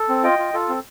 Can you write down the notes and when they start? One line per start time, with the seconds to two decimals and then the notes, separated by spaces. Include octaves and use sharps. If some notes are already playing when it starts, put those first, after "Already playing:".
Already playing: A4
0.09 C4
0.23 F4 D#5 G5
0.39 F4
0.54 F4 A4
0.69 C4